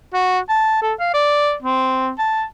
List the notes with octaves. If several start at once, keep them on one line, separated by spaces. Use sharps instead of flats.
F#4
A5
A4
F5
D5
C4
A5